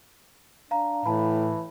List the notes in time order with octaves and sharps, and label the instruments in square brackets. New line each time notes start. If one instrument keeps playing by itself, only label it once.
[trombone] D4 [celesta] F5 A#5
[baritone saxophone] A2 [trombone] E3 [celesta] A5 B5